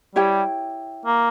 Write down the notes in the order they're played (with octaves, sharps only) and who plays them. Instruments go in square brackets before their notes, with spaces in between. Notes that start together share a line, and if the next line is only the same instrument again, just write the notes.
[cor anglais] G3 [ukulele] E4 G4 C#5 G5
[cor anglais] A#3